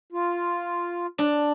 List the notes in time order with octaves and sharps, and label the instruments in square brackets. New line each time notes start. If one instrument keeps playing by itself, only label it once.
[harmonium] F4
[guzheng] D4